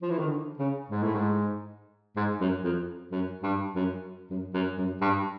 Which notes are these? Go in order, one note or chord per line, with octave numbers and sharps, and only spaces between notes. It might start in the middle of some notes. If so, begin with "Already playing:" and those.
F3
E3
D#3
D3
C#3
G#2
A2
G#2
G#2
F#2
F2
F#2
G2
F#2
F#2
F#2
F#2
G2